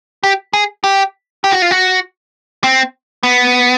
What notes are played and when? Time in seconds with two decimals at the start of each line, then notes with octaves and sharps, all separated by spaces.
0.23 G4
0.53 G#4
0.84 G4
1.44 G4
1.52 F#4
1.62 F4
1.71 F#4
2.64 C4
3.23 B3